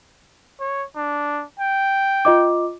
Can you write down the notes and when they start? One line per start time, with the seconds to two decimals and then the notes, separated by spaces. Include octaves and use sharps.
0.60 C#5
0.96 D4
1.59 G5
2.25 F4 D#5 D6